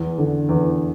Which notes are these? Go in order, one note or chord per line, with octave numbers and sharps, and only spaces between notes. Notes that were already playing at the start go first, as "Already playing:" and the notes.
Already playing: E2
D3
E2